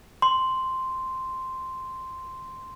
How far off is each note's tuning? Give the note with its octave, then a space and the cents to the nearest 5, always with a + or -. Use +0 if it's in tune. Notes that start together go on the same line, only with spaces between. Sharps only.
C6 -5